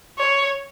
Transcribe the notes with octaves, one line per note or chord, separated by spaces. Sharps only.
C#5